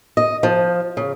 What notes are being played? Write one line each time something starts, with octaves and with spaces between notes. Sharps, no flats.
D#5
F3
C#3